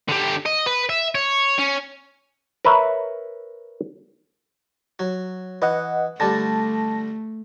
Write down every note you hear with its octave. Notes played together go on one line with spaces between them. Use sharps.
D3 G4
D#5
B4
E5
C#5
C#4
A#4 B4 C#5 E5
F#3
E3 B4 D#5 F#5
D3 G3 A3 A5 A#6